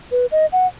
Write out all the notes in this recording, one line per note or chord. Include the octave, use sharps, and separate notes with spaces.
B4
D#5
F#5